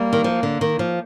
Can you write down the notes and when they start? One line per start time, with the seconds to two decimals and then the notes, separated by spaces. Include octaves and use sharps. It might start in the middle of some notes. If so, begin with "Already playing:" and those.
Already playing: G3 A#3
0.13 D#3
0.24 F3
0.43 D3
0.61 D#3
0.79 F3